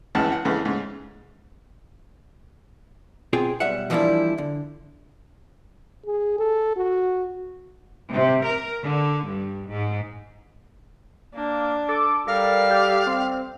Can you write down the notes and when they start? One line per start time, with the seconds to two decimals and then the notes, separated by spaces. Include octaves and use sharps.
0.15 G#1 C#2 C#3 E3 F#5 A5
0.32 F#5
0.45 F2 G#2 C#3 E3
0.65 G#2 C#3
3.33 B2 C4 F4 G#4 G5 G#5
3.60 B1 G3 E5 F#5
3.90 E3 F3 G3 A#3 D4 E4
4.38 D3
6.06 G#4
6.39 A4
6.76 F#4
8.12 C3
8.46 A#4
8.84 D3
9.26 G2
9.70 G#2
11.34 A#3 D4
11.88 A4 D6
12.27 G3 A4 A#4 D5 F5
12.70 G4
13.07 C4